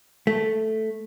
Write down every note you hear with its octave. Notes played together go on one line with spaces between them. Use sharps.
A3